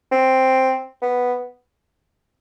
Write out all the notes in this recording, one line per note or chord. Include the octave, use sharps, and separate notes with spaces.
C4
B3